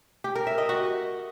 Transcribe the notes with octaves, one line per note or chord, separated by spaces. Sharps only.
G4
A#4
E5
D#5
F#4